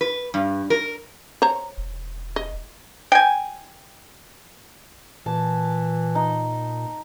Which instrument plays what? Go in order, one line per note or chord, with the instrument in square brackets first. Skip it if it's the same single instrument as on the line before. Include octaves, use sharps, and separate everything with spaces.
[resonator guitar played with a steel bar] B4
G2
A#4
[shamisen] C5 C#5 A#5
[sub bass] E1
[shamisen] D#5
[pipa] G5 G#5
[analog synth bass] A#2 [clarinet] E3 [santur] A5
[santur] D#4